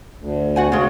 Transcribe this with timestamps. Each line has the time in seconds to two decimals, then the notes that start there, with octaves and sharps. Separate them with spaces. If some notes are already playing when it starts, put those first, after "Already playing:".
0.17 D2
0.56 F#4 F#5 G#5
0.72 C#3 G#3 F#4